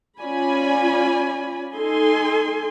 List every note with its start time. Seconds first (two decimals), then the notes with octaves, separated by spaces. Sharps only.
0.20 C#4 F4 D5 G#5 B5
1.74 D#4 A4 G#5 C6